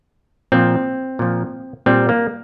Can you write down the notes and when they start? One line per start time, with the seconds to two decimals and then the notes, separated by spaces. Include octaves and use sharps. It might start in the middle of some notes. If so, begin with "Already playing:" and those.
0.52 A#2 F3 C4
1.19 A#2 F3
1.86 A#2 G3 C4
2.09 A#3